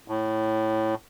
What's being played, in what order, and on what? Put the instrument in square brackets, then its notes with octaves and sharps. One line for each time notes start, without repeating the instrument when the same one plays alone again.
[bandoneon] A2